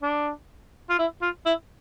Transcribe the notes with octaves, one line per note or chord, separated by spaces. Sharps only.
D4
F4
E4
F4
E4